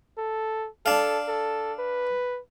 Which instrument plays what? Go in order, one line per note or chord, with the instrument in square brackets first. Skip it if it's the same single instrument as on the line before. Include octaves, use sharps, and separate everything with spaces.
[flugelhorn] A4
[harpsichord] D4 F5 [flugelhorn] A4
[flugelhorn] A4
B4